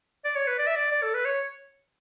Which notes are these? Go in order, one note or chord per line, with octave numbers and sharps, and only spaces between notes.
D5
C#5
B4
D5
E5
D5
D5
A4
B4
C#5